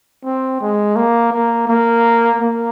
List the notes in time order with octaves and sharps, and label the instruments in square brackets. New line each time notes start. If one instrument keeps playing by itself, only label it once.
[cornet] C4
G#3
A#3
A#3
A#3
A#3